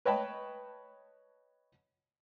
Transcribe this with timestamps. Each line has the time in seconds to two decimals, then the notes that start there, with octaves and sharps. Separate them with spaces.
0.05 B4 C#5 D#5 G5 A5 B5